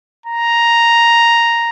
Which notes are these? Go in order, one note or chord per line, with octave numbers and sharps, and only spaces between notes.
A#5